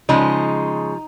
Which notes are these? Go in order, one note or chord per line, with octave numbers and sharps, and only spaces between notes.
C#3 F3 G#3 D#4